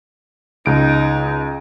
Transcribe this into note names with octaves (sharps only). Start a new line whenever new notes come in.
C#2 D#4 D7